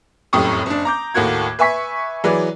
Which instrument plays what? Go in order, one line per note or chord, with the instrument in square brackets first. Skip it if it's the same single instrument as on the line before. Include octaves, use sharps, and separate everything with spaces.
[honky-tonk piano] F1 F#2 A2 G4 C#6 D#6
F#1 D4
A#5 D6 G6
D#2 A2 A#3 F#4 G#6
B4 E5 G#5 C#6 B6
E3 F#3 G#4 B4 D5